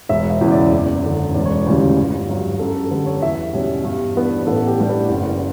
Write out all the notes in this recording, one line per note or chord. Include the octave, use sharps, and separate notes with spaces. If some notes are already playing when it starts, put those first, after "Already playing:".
E1 E5
E5
E2 C#3 E3
D5
F#1
F#2 D3
E1 D5
C#5
D5
D2 C#3 E3 G3
G1
G2 F#3
F#2 A4
A4
D3 G3 B4
C#5
E2 E5
B2 G3 C#4
G2
E3 B3 D4
B4
A1 A4
G4
A2 G3 D4
B4
F#1